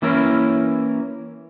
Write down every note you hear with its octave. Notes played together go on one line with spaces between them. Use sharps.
E3 A#3 C#4 E4 A#4